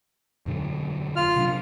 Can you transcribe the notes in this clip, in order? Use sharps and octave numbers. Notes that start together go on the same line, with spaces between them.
E1 F#2 D3
F4 F6
C3 F#3 D4